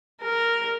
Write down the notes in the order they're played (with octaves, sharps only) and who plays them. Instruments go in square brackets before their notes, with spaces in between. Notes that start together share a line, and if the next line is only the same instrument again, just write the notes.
[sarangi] A#4